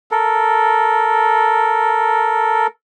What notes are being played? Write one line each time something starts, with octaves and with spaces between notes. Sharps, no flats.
A4 A#4